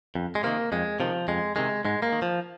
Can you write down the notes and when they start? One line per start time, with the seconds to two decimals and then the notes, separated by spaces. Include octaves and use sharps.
0.15 F2
0.35 G#3
0.43 C3 D#3 A#3
0.72 F2 G#3
1.00 C3 D#3 F3
1.28 F2 G#3
1.56 C3 D#3 G#3
1.85 G#2 G#3
2.02 A#3
2.12 D#3
2.22 F3